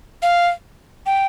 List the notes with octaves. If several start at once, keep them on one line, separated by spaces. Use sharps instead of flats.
F5
G5